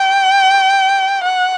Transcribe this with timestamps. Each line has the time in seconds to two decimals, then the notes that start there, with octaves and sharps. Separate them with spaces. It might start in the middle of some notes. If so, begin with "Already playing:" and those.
Already playing: G5
1.24 F#5